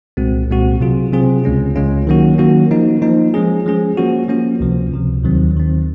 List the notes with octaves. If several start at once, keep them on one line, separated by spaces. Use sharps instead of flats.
C2 A#2 G#3 C4 F#4
C2 A#2 G#3 C4 F#4
C3 F#3 C4 F4 G#4
C3 F#3 C4 F4 G#4
C#2 C#3 G#3 C#4 F4
C#2 C#3 G#3 C#4 F4
D#3 F#3 A#3 C#4 F#4
D#3 F#3 A#3 C#4 F#4
F3 A#3 D#4
F3 A#3 D#4
F3 G#3 C#4 G#4
F3 G#3 C#4 G#4
F3 A#3 C#4 F#4
F3 A#3 C#4 F#4
C#2 C3 F3
C#2 C3 F3
D#2 D#3 F#3 C4
D#2 D#3 F#3 C4